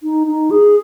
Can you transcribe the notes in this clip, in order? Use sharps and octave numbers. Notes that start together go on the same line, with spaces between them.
D#4
D#4
G#4